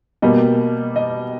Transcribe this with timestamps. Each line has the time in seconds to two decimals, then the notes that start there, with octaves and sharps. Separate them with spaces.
0.22 B2 G3 A#3 D#5
0.96 D#5